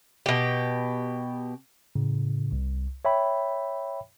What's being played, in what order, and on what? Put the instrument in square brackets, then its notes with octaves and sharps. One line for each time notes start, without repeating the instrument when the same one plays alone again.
[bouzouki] B2 G4
[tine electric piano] A2 C#3
C2
C#5 E5 G5 B5